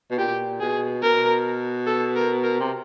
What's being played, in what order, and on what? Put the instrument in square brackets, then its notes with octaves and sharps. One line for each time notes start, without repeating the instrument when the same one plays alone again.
[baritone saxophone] B2
[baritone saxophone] A#2 [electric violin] G4
[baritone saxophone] B2 [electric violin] G#4
[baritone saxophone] B2 [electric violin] A#4
[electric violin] A4
A#4
A#4
[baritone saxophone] C3